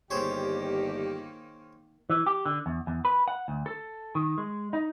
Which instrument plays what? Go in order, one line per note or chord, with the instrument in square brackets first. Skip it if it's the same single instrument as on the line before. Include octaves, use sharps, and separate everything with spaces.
[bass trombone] G1 [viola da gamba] D#3 A#3 [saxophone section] G4 [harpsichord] G#4 C5 C#5
[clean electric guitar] E3
G4
D3
E2
E2
B4
F#5
D2
A4
D#3
G#3
D#4